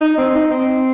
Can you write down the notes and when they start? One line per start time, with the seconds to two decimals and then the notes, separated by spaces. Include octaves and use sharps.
0.01 D#4
0.18 C4
0.35 D#4
0.51 C4